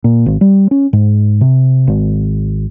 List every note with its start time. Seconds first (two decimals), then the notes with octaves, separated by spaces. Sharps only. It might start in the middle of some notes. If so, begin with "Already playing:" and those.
0.04 A#2
0.26 G#1
0.41 G3
0.71 C#4
0.93 G#2
1.41 C3
1.87 G#1